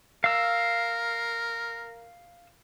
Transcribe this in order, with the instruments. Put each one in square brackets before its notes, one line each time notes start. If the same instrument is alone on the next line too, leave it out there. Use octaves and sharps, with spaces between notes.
[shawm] A#4 [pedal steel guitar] F5 E6